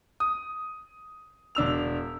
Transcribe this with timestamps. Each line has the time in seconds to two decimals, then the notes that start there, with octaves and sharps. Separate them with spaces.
0.20 D#6
1.55 E1 D4 E6 F7